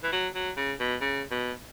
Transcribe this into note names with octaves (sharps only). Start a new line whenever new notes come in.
E3
F#3
F#3
C#3
B2
C#3
B2